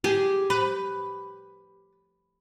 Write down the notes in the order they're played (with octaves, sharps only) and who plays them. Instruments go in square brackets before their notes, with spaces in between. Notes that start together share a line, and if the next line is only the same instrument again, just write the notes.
[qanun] G4 [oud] G#4
[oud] B4